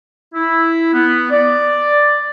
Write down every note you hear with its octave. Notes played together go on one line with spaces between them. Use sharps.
E4
B3
D5